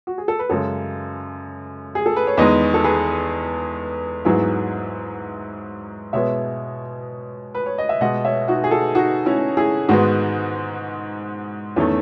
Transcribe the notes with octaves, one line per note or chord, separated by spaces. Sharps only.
F#4
G#4
A4
B4
F#2 C#3 G#3 A4 C#5
G#4
A4
B4
C#5
E2 D#3 G#3 B4 D#5
A4
G#4 B4
G#2 F#3 B3 E4 G#4
B2 G#3 B3 C#5 E5
B4
C#5
D#5
E5
B2 G#3 B3 D#5 F#5
C#5 E5
D#4 F#4
G#4
F#4 A4
D#4 F#4
C#4 E4
E4 G#4
G#2 D#3 G#3 B3 D#4 F#4
E2 D#3 A3 C#4 E4